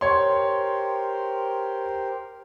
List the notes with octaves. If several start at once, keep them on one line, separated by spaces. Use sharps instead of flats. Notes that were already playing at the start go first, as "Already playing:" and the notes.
G4 A#4 C5 C#5 C6